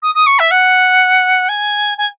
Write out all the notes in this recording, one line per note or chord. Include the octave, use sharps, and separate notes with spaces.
D#6
D#6
C#6
E5
F#5
G#5
G#5